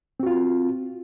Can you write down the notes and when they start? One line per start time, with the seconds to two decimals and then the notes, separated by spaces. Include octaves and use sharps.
0.20 C4
0.23 F#4
0.26 F4